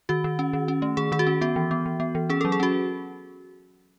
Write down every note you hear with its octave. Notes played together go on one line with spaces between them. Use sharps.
D#3 F#4
D#3
C#4
D#3
C#4
A3
D#3 G#4
D#3 G#4
F#4
C#4
B3 F#4
E3
B3
E3
B3
E3
C#4 G#4
A4
F#3
G#4
C#4 F#4